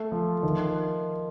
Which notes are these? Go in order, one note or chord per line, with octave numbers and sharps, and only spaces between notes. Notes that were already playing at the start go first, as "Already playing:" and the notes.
Already playing: A3
F3
D#3